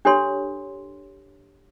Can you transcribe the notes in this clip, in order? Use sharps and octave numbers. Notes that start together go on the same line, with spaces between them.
D4 G4 A4 C#5 C6